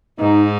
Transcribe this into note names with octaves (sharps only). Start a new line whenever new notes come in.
G#2 D#4